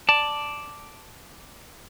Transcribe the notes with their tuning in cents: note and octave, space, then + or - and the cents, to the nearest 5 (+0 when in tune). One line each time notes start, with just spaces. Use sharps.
D5 +0 A5 +0